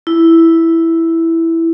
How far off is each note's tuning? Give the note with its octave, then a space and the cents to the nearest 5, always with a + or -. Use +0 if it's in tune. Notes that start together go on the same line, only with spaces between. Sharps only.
E4 +0